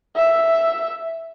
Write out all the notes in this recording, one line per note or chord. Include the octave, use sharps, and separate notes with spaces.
E5